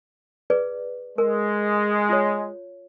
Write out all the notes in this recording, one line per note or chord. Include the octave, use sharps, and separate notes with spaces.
G#4 B4 D5
G#3 A#4
F4 C#5